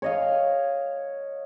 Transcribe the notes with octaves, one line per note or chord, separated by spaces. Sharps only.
C#5 D#5 F5